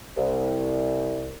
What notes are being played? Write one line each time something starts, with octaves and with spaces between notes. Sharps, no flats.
C2